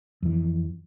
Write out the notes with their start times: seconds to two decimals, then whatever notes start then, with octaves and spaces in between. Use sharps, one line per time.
0.22 F2 E3